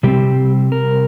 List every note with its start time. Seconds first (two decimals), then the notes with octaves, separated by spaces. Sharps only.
0.03 C3 G3 C4 G4
0.72 A#4